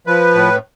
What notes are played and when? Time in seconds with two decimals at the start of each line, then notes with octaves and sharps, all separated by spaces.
0.07 F3 B4
0.35 A2